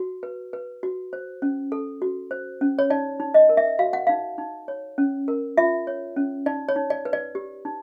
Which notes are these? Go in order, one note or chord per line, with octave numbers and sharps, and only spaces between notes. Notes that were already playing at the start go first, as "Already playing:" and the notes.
Already playing: F#4
B4
B4
F#4
C5
C#4
A4
F#4
C5
C#4
C#5
D#4 D5
D#4
D#5
A#4
E5
F#4 F5
F#5
D#4 F5
D#4
C#5
C#4
A#4
F4 E5
C#5
C#4
D#4 D5
C#5
D#4
D5
B4
D5
G4
D#4